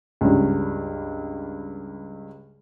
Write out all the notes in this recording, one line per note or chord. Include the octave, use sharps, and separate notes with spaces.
C#2 G2